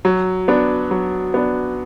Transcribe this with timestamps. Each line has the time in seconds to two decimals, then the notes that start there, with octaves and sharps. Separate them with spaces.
0.05 F#3
0.48 B3 D4
0.91 F#3
1.34 B3 D4